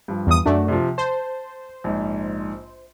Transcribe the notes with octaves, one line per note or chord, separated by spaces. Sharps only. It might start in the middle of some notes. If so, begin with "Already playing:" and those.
G2 F3
E2 D#6
F#2 A3 D4 F#4
C3 F3
C5 A5
A#1 G#2